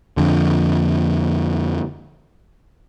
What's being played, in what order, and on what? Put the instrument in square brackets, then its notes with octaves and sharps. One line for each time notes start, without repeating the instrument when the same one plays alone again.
[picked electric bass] F2 D3